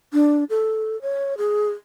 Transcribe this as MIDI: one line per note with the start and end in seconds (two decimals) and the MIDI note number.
0.13 0.44 62
0.50 1.00 69
1.02 1.37 73
1.38 1.70 68